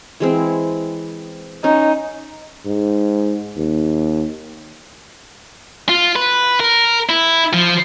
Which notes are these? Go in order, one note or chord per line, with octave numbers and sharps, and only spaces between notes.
E3 G#3 C4
C#4 D#4
G#2
D#2
F4
B4
A#4
E4
F3